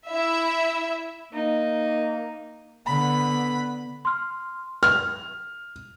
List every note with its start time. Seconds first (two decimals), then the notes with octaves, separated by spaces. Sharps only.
0.10 E4 E5
1.33 A#3 D#4
2.87 D3 B3 B5
4.05 C6 F6
4.83 F6